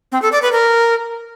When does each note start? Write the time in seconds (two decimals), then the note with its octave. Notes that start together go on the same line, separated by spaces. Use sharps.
0.12 C4
0.22 A4
0.32 D5
0.42 B4
0.52 A#4